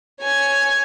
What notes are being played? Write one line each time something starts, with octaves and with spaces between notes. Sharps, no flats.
C#5 G#5